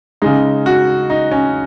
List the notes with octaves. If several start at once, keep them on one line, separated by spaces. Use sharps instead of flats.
C#3 G#3 D#4
F#4
D#4
C#4